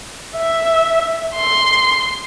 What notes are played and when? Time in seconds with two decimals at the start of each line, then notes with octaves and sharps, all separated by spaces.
0.37 E5
1.37 C6